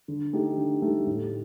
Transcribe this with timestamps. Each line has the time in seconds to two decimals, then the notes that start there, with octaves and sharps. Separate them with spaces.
0.08 D3
0.33 A3 D#4 G4
0.58 D3
0.82 A3 D#4 G4
1.06 A2